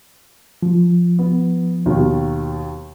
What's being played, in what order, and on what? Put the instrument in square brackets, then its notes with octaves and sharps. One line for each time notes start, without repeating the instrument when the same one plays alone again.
[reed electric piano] F3
[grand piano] B3
D#2 B2 D#3